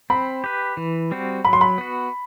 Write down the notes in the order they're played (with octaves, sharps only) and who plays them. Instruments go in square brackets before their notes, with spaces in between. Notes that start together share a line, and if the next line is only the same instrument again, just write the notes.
[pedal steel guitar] C4 [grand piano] B5
[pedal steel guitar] G4 B4
E3
G3 C4 F#4
[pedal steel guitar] F#3 [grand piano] B5
[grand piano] C6
B5
[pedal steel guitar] B3 F#4